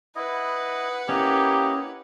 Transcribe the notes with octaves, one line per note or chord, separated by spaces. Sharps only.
E4 B4 D#5 F#5
A#3 C#4 E4 G4 D#5